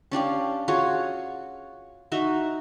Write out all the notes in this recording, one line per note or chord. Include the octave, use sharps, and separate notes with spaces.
C#4 D4 G4 F5
F4 F#4 G#4 C#5
D#4 F#4 E5